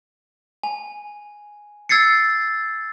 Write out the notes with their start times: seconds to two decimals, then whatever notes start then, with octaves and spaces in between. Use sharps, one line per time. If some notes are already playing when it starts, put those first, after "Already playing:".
0.63 G#5
1.89 E6 G#6 A6 C7 C#7